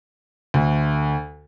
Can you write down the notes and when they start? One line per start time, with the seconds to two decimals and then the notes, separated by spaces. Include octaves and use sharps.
0.54 D2